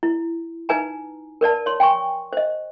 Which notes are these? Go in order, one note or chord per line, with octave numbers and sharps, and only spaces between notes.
E4
D#4 B4 G#5 A#5
A#4 B4 D5 A5
C#5 C6
G5 G#5 C6 C#6
C5 D#5